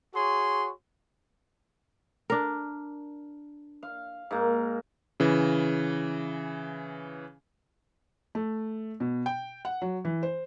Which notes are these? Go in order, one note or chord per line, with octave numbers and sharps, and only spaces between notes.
F#4 G#4 C#5 C6
D4 A#4
F5
G#2 A#3
C#3 E3
A3
B2
G5
F#5
F#3
E3
C5